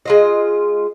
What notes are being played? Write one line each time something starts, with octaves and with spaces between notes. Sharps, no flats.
G#3 F4 D#5